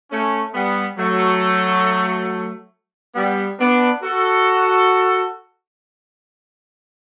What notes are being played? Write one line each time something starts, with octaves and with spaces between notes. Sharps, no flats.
A3 C#4
G3 B3
F#3 A3
G3 B3
B3 D4
F#4 A4